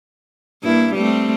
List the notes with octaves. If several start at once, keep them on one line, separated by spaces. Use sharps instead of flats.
G2 A#3 E4
G3 A3 C4